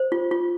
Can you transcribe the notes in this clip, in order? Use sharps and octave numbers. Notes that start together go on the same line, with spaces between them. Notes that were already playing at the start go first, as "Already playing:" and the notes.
Already playing: C5
F4
F4